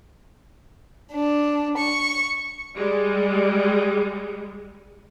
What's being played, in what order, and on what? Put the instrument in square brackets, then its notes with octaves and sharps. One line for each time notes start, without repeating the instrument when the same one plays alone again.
[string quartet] D4
C#6
[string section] G3 G#3